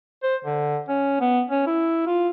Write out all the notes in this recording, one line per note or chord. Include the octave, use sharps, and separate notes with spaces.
C5
D3
C#4
B3
C#4
E4
F4